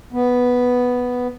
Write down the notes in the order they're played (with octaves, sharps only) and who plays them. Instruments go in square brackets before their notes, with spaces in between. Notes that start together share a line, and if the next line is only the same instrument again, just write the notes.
[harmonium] B3